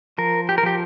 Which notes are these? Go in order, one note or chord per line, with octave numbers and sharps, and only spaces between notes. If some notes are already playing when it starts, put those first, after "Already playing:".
F3 A#4
G4
A#4
F3 G4